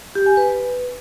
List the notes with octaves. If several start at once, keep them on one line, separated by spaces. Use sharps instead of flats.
G4
G#5
B4